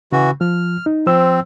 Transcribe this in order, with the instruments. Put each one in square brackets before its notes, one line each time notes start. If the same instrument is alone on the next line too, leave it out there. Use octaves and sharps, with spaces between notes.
[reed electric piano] C#3 [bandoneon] E3 F#4
[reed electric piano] F3 [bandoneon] F6
[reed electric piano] D#4
[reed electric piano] F3 C5 E6 [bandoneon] C4